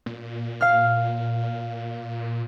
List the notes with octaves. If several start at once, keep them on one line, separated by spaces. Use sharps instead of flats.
A#2
F5 F6